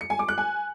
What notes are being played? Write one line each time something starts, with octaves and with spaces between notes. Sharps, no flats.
C#7
G#5
D6
F#6
G#5